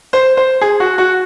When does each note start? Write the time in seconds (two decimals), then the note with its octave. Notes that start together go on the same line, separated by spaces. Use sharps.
0.13 C5
0.37 C5
0.61 G#4
0.80 F#4
0.98 F#4